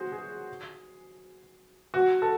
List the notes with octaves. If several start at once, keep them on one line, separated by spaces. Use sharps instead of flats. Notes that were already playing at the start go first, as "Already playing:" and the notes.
Already playing: F#4 G#4 C5
G#4
F#4
A4